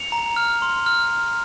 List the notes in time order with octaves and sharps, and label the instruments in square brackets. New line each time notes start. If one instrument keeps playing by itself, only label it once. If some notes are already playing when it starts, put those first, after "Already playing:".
Already playing: [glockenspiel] C#7 F7
A#5
F6
C6
F6